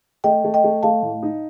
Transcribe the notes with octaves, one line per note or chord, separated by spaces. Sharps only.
A3 D#5 G5
A3
D#5 G5
A3
A3 F5 A5
A2
D#4